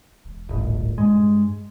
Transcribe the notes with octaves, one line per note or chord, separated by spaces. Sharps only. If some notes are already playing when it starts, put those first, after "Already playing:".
E1
D1 G#1 A#2
G2 G#3